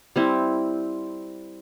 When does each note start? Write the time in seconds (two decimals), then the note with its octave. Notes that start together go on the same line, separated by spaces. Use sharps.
0.16 G3 C4 E4